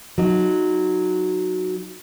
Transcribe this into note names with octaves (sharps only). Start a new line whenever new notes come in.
F#3 D#4